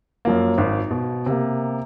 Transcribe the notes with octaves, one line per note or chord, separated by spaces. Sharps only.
F#2 F3 A#3
G#1
B2
C3 A#3